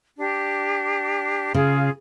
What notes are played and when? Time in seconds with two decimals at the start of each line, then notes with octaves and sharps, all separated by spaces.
0.18 D4 G4
1.54 C#3 F4 G#4 F5